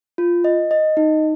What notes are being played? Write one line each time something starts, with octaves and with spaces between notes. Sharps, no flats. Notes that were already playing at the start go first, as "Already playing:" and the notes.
F4
D#5
D#5
D#4